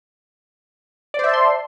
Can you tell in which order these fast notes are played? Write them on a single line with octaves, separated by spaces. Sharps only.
D5 C5 E5 A5 C6